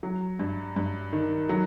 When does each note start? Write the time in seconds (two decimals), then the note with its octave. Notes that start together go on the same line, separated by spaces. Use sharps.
0.03 F#3
0.39 G2
0.76 G2
1.13 D#3
1.49 F#3